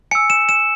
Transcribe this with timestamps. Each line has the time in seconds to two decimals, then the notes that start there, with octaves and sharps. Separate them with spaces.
0.11 G#5 E6 C#7
0.30 E7
0.49 E7